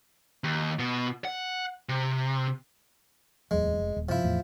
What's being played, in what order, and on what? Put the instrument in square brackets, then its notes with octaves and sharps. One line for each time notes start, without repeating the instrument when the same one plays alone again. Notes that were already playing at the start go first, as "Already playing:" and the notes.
[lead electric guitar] D#2
B2
F#5
C3
[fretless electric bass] D1 E2 F#3 [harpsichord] G#3
[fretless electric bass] F1
D#1
[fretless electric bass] G2 C3 [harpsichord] F3 E4
[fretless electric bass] E2 A2